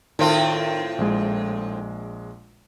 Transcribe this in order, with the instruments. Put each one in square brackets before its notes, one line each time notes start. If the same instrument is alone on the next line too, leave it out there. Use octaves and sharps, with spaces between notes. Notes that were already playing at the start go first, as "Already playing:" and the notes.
[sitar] A2 C4 F4 [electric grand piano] D#3
[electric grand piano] A#1 G#3